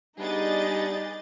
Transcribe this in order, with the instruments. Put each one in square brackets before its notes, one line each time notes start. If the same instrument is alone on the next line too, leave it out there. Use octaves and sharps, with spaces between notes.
[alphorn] G3 [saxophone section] B3 D4 [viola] D#4 D#5 [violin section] G#4 G6 A6